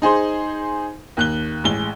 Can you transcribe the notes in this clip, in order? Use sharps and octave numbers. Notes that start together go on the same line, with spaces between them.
D#4 G#4 C5 C6
D#2 F#6 G7
A1 G#3 G7